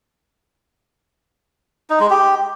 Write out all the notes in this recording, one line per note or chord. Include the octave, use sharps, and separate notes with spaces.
D#4
G#3
G4